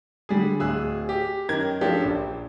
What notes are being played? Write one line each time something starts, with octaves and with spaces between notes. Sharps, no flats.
D3 G3 G#4
D1 G#4 E6 F#6
G4
F#2 D#3 A#5 G#6
F3 A#3 C#4 D4 G4 A4
A#1